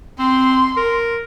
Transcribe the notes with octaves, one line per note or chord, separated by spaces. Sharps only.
C4 C6
A#4